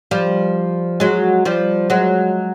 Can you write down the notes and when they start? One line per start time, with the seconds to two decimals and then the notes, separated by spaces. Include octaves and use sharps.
0.11 F3 G3
1.00 F#3 G#3
1.45 F3 G3
1.90 F#3 G#3